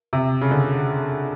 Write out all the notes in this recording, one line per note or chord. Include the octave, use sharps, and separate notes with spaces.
C3
C#3
D3